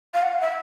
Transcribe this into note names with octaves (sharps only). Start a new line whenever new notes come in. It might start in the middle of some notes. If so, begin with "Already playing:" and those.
F5
F#5
F5
E5